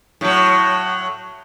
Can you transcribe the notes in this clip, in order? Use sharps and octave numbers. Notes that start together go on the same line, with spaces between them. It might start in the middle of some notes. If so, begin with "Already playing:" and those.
A2 F#3